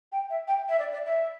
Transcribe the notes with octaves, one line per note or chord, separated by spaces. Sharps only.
G5
E5
G5
E5
D5
D5
E5